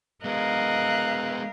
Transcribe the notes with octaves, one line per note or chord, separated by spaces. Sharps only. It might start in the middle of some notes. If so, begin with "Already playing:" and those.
G#3 B3 A#4 D#5 F5 F#6